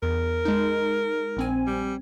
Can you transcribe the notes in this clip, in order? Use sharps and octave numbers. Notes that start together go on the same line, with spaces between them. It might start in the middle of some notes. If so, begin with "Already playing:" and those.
E2 A#4
G#3 D#4
A#1 C4 G#5
G3